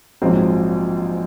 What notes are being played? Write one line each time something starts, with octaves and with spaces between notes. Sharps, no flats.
A#1 G#2 F#3 C4